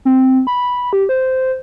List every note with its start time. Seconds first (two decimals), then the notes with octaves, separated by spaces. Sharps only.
0.05 C4
0.47 B5
0.93 G4
1.09 C5